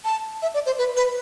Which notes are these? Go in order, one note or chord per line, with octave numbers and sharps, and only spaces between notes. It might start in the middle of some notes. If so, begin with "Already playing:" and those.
A5
E5
D5
C5
B4
B4